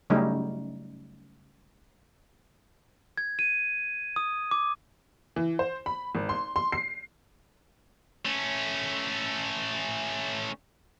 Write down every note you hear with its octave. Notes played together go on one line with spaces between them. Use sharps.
C#3 F#3 G3 A3 C#4 D#4
G#6
D#7
D#6
D6
E3
C5
B5
G#1
C6
C6
C7
A3 C#4